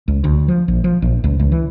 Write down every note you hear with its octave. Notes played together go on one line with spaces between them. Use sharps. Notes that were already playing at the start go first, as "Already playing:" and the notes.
C#2
D2
F3
A#1
F3
A#1
C#2
C#2
E3